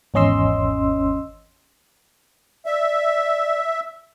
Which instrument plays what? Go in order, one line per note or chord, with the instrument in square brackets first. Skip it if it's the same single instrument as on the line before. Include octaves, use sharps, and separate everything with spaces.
[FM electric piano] G#1 E2 C#4 D#5 C6 E6
[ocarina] D5 [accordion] E5